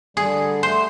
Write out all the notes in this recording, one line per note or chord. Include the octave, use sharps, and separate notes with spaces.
D3 G3 G#4
A3 C5